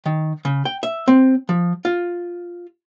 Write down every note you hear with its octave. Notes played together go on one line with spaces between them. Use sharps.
D#3
C#3
G5
E5
C4
F3
F4